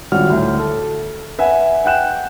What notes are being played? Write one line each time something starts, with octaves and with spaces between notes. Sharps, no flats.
G#1 G3 C#4 F4 F#4 F6
D2 A2
A4
B4 E5 F#5 G#5
F#5 G5 F#6 E7